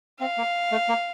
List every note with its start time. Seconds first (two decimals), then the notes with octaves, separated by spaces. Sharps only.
0.20 C4 F5
0.38 A#3
0.71 A3
0.89 A#3